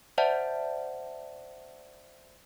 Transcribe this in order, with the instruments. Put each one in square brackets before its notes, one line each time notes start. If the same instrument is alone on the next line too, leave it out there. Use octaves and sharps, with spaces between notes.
[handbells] C5 D5 E5 F#5 A5